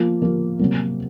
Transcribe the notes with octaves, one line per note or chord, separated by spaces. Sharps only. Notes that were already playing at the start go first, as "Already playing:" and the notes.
Already playing: F3 A#3 F4
F3 A#3 F4
C3 F#3 A#3